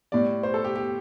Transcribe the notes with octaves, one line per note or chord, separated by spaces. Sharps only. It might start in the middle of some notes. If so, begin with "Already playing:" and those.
A2 G3 D5
C5
A4
G4
G4